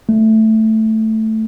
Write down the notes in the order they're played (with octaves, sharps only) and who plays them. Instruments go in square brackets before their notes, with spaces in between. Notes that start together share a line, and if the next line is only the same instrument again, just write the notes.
[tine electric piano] A3